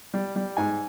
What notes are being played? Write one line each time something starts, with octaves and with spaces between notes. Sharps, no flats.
G3
G3
G#2 G#5